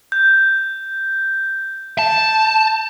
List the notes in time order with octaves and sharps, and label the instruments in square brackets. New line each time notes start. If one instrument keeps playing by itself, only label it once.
[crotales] G6
[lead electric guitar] A5